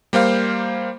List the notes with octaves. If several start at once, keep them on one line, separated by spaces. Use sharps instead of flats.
G3 A#3 C5 F5